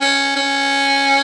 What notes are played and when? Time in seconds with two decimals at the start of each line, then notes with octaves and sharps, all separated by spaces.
0.01 C#4
0.36 C#4